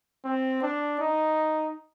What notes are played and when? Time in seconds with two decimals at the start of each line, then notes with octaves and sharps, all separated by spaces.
0.24 C4
0.62 D4
0.99 D#4